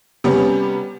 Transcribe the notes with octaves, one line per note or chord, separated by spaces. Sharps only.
C3 G3 B3 C#4